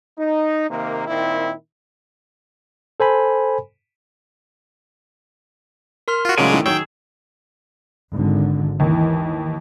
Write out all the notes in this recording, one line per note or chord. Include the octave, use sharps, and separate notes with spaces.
D#4
C3 D#3 A#3
A#2 D#3 C4 E4
A4 C5 G#5 B5
A#4 C6 F6
F4 F#4
A2 C#3 F#3 G#3 C#4 F4 D5 G#5
A2 D#3 E3
D#3 F#3 G#4 C#5 G5 E6
G#1 D3
D#2 E3